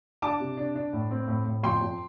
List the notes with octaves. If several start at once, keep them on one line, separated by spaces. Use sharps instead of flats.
D4 A5 D6
C3
D4
D4
A2
C4
A2
A2
F2 G5 C6
F2